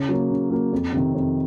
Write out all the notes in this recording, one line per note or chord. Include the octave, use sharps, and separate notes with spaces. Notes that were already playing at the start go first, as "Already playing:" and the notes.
Already playing: C#3
F#3 A#3
C#3
F#3 A#3
F2
C3 D#3
F2